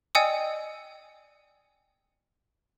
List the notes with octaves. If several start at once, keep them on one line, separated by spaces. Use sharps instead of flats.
D5 D#5 G5 G#5 D#6 E6